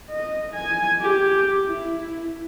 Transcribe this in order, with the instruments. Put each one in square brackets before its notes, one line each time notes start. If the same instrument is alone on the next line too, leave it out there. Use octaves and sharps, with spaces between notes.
[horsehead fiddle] D#5
G#5
G4
E4